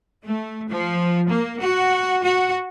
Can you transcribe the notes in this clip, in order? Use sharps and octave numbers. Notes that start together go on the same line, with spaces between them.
A3
F3
A#3
F#4
F#4